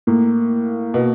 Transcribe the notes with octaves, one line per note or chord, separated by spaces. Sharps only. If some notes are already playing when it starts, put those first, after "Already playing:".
A2 A#3
B2